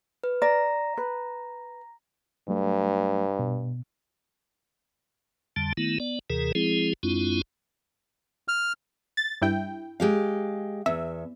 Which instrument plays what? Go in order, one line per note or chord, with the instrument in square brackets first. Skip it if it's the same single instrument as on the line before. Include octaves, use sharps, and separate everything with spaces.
[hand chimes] B4
[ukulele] D5 [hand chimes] A#5 A#6
[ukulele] B4
[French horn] G2 [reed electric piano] F#3 A3
[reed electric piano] B2
[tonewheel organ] F2 D3 G3 A5
D#3 A3 B3 E4
B3 D5
D#2 C3 E3 G#4 A#4
F3 G#3 C4 E4 G#4
F#2 G#3 C4 D4 E4 F4
[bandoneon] F6
[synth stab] A6
G2 E4 G5
[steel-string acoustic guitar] G#3 G4 F5
[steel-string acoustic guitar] E2 [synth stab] E5